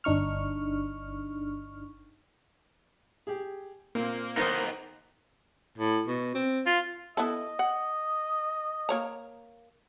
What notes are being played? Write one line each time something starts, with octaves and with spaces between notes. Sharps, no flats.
G1 D4 D#4 C#6 F6
G4 G#4
A#2 A#3 C4
D#3 B3 D#4 A#4 C5 D#5
A2
B2
C4
F4
B3 E4 A4 D#5
F#5
A#3 C#5 A#5